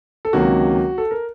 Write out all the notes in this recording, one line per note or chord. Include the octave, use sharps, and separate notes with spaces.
A4
C#2 C3 D#3 F#3 A#3 F#4
A4
A#4